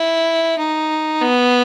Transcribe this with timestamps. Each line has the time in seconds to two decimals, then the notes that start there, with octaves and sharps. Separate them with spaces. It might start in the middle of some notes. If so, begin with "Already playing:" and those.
Already playing: E4
0.58 D#4
1.21 B3